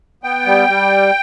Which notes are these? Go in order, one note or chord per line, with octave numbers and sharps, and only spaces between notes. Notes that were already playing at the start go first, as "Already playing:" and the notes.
B3 G5
G3
G3